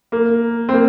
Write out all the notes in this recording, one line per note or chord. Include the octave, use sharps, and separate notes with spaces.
A#3
C4
A#3